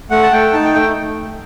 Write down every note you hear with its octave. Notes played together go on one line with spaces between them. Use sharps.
A3 F#5
A5
A3 G5
D#4 A5
G5
A3 G5